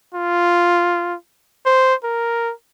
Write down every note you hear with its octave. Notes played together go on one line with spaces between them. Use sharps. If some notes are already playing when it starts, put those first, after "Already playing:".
F4
C5
A#4